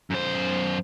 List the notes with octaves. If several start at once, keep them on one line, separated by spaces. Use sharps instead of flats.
F#2 C5